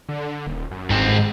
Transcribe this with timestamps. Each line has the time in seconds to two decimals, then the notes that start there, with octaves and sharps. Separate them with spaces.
0.09 D3
0.47 D#1
0.71 F#2
0.90 G1 G#2 C4
1.19 G#2